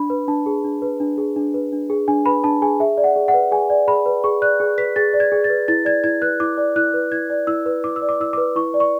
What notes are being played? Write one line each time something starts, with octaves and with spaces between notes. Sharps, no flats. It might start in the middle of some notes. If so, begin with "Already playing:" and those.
Already playing: D4 B5
B4
D4 A5
G#4
D4
B4
D4
G#4
D4
B4
D4
G#4
D4 G#5
B4 B5
D4 A5
G#4 G#5
G#4 E5
D5
F#5
G#4
F#5
B4
G#4 G#5
D5
G#4 B5
B4
G#4 C#6
D5 F#6
G#4
B4 B6
G#4 A6
D5
G#6
G#4
A6
B4
E4 A6
D5 G#6
E4 G#6
B4 F#6
E4 D6
D5
E4 F#6
B4
E4 G#6
D5
E4 E6
B4
E4 D6
E6
D5
D6
E4 E6
B4 D6
E4 C#6
D5
C#6